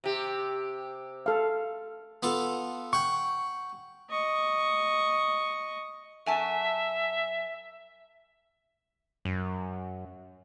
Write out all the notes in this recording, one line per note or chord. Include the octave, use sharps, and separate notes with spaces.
C3 G4
A4 F5
B3 F4 A4
F#5 G5 C#6
D#5 C#6
F#2 E5 G#5 A5
F#2